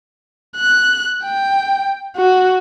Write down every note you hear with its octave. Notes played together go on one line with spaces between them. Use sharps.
F#6
G5
F#4